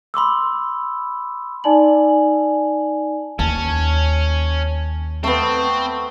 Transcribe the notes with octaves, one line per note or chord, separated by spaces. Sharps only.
B5 C6 D6 E6
D#4 D5 G#5 A5 F#7
D#2 C#4 A5
A3 B3 C4